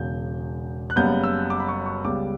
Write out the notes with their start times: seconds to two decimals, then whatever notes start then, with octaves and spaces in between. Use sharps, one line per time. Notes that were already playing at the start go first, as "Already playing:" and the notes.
Already playing: E1 E2 C#3 G6
0.90 F#6
0.96 F#1 F#2 C#3 G3 B3 G6
1.24 E6
1.50 D6
1.60 B5
1.68 C#6
1.86 C#6
2.04 C#2 C#3 G3 B3 D6